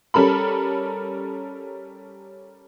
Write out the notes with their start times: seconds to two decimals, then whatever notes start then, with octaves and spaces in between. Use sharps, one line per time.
0.14 G3 C#4 A4 A#4 B5